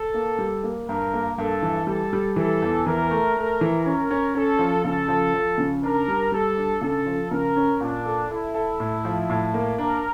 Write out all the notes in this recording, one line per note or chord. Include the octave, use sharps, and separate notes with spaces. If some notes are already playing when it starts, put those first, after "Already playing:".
Already playing: A4
A#3
G3
A#3
G2 A#4
A#3
G2 A4
E3
G3 A4
G3
E3 A4
E2
E3 A#4
A3
A3 A#4
E3
C#4 A#4
C#4
C#4 A4
F3
C#3 A4
F3
F3
C#3
D4 A#4
G3
G3 A4
D4
C#3 A4
F3
C#3 A#4
C#4
A#2 D4
A4
E4 A4
A4
A2
F3
A2
A#3
D4 A#4